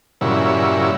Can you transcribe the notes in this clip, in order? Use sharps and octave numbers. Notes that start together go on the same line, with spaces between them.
G2 A#2 C#3 F#3 E4